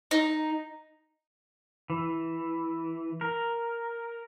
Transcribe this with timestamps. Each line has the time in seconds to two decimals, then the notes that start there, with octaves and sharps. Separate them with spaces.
0.11 D#4
1.90 E3
3.21 A#4